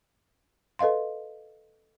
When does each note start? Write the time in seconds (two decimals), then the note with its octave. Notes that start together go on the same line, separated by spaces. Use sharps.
0.79 A4 B4 D#5 F5 C6